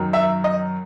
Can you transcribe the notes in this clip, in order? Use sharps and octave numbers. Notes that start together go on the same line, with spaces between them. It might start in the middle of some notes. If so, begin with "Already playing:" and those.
Already playing: F#2 D#3 F#3
E5
D#5